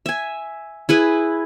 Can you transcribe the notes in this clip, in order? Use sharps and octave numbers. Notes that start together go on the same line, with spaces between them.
E5 G#5
E4 G#4 B4